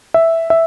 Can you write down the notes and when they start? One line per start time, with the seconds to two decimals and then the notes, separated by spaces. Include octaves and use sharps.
0.14 E5
0.50 E5